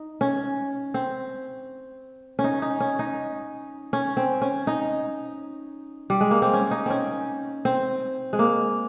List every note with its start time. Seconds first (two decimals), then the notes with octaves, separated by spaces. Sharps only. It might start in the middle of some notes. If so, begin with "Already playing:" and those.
Already playing: D#4
0.21 C#4
0.94 C4
2.39 C#4
2.44 D#4
2.62 D#4
2.80 C#4
2.99 D#4
3.93 C#4
4.17 C4
4.42 C#4
4.67 D#4
6.10 G3
6.21 G#3
6.31 A#3
6.42 C4
6.53 C#4
6.71 D#4
6.86 C4 C#4
7.65 C4
8.33 G#3
8.39 A#3